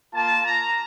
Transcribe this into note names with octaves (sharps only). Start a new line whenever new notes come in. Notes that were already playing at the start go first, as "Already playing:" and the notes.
A#3 F4 A5
A#5